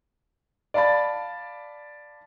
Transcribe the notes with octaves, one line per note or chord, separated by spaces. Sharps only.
D5 F5 A5 B5 A6